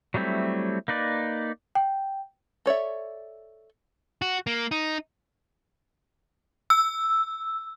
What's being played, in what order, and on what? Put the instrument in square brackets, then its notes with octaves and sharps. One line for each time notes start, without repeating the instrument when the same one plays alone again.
[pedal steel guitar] F#3 G3 A3 C4 E4
A#3 D#4 B4 D5
[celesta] G5
[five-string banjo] A4 C#5 D5 E5
[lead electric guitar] F#4
A#3
D#4
[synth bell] E6